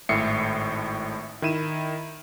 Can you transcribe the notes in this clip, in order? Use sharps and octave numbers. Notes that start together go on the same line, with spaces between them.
G#1 A2 E5 C7 C#7
D#3 E4 D#7 E7